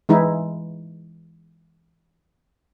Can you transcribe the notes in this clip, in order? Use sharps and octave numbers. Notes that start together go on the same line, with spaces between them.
E3 G#3 D#4 E4